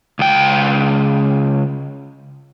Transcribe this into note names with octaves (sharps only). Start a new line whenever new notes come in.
C#2 G5